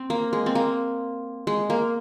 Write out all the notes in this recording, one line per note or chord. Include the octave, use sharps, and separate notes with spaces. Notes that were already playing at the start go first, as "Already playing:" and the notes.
Already playing: C4
A#3
G#3
C4
A#3
G#3
A#3